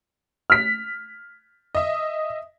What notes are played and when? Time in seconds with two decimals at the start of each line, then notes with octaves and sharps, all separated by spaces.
0.50 F6 B6
1.75 D#5 E5